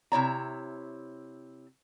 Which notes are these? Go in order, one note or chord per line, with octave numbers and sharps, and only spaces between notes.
C3 E4 C#5 A#5